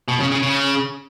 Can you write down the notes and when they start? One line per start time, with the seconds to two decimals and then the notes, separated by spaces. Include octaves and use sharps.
0.08 B2
0.20 C#3
0.32 C#3
0.43 C#3